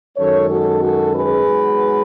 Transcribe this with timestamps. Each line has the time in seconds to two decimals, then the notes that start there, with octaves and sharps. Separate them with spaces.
0.17 F#2 D#3 G#3 C#4 A4 C#5
0.49 F#4 A4
0.81 F#4 A4
1.13 G#4 B4
1.46 G#2 F#3 B3